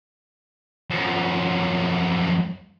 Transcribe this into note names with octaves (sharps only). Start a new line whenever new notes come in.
F#2 F3